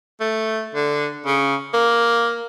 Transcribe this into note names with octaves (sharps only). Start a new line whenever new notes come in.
A3
D3
C#3
A#3